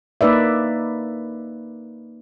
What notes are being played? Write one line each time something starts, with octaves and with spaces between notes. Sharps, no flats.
A#3 D#4 B4 D5 E5